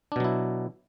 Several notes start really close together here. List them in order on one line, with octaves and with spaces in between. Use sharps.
D4 B2 F#3 E4